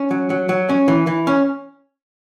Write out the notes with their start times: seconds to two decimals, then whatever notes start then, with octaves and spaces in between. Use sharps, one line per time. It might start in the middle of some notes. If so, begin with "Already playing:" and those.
Already playing: C#4
0.11 F#3
0.30 F#3
0.49 F#3
0.69 C#4
0.88 E3
1.07 E3
1.27 C#4